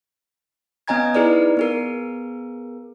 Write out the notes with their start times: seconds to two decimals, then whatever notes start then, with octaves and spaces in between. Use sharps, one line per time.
0.88 B3 C#4 D#5 G#5 A#5 G#6
1.15 D#4 E4 G#4 B4 D5
1.57 B3 G#4 A#4